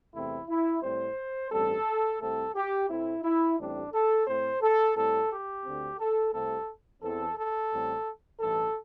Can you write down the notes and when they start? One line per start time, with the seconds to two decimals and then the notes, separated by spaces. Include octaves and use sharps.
0.14 E2 C3 A3 C4 E4
0.48 E4
0.83 A2 G3 C4 C5
1.51 A1 G2 G3 C4 A4
2.20 C2 C3 A3 C4 A4
2.55 G4
2.89 A2 A3 C4 E4
3.23 E4
3.58 A1 A2 G3 C4 D4
3.93 A4
4.27 A2 A3 C4 C5
4.62 A4
4.96 A2 G3 C4 A4
5.30 G4
5.65 D2 D3 C4
5.99 A4
6.33 C2 C3 A3 C4 A4
7.02 E2 E3 C4 A4
7.37 A4
7.71 A1 A2 G3 C4
8.40 A1 G2 E3 A4